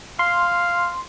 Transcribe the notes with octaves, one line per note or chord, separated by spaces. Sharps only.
F5 C6